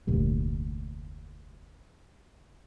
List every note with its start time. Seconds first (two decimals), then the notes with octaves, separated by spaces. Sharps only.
0.07 F1 D2 A#2 G3